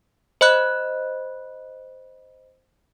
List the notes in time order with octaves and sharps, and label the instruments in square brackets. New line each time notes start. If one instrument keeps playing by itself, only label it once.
[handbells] C5 D#5 B5 F#6